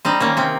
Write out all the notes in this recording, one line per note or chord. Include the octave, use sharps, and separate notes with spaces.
G3 C4 D#4
D#3 A#3 C#4
C3 C4